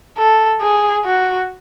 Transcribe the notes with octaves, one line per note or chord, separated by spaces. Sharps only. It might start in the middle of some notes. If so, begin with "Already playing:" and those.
A4
G#4
F#4